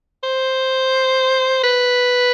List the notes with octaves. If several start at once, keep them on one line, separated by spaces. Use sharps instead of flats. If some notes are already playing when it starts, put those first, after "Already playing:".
C5
B4